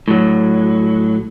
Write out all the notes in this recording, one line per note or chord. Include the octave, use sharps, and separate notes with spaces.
A2 F#3